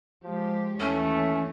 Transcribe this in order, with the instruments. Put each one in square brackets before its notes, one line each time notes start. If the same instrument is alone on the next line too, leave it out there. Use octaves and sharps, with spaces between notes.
[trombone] F3 [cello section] G#3 G4
[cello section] D#2 E3 C#5 [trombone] A3 [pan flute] C#4